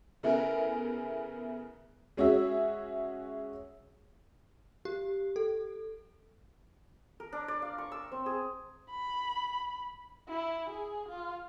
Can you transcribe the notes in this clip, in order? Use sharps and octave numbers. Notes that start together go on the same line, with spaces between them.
C#3 A3 B3 E4 G#4 A#4
G#3 C#4 F#4 G#4 E5
G4
A4
A#4
D4
D5
F5
C#6
E6
C4
G#4
B5
E4
G#4
F4